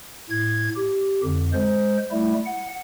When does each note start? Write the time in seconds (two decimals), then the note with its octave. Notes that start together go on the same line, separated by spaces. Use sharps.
0.30 A2 G#6
0.76 G4
1.23 F2 D3
1.53 G#3 C5
2.11 G3 A3 E4
2.46 F#5